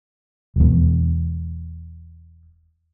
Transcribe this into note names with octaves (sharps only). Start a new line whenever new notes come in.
E1 E2